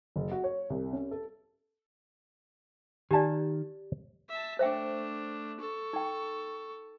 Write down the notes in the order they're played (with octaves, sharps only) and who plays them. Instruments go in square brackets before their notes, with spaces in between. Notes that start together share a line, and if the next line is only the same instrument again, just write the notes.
[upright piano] F#1
F#4
C#5
C2
C#4
A4
[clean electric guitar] D#3 [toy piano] G4 D5 [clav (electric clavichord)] G#5 A5
[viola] E5 A5
[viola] A3 D4 [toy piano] C5 E5 G5
[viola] A4 C#6
[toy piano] D#4 G5